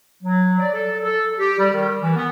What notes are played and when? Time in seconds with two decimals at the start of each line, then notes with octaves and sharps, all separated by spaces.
0.23 F#3
0.60 D5
0.73 A4
1.03 A4
1.39 G4
1.58 G3
1.73 D#3
2.01 E3
2.16 B3